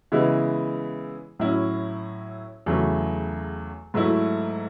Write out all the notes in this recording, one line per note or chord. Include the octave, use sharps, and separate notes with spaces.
C#3 E3 G#3 B3 E4
A2 F#3 C#4 E4
E2 C#3 F#3 A3
G#2 F#3 A3 E4